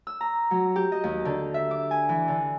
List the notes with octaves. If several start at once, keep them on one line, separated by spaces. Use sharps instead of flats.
E6
A#5
F#3
G4
D#5
D#2
D3
E5
D6
G#5
E3
D3